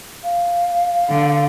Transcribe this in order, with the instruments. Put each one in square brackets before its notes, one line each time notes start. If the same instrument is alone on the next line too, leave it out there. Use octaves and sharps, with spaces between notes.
[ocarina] F5
[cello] D3